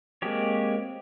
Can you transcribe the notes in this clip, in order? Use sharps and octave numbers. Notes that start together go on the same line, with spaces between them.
G#3 A#3 C4 G4 C#5